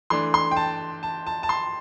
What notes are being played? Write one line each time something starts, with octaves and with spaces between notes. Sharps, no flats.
E3 A3 D4 C6
C6
G5
A5
A5
A5
A5
C6